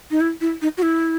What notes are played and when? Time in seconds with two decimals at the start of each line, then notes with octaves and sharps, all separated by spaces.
0.11 D#4
0.21 E4
0.41 E4
0.62 D#4
0.77 F#4
0.82 E4